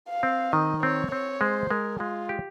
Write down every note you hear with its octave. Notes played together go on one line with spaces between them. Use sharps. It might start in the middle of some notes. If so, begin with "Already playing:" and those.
F5
C4
D#3 D#5
C4 C#5
C4 C#5
G#3 C5
G#3 A#4
G#3 F4
G4